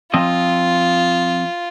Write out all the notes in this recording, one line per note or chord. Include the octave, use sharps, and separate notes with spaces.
F3 C4 F4 D#5